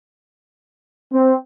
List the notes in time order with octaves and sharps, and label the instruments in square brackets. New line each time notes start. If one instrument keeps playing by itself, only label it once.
[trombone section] C4